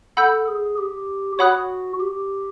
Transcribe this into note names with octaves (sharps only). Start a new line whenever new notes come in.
A4 F#5 B5 E6 G6
G#4
G4
F#4 C#5 F#5 B5 D#6 F#6
G4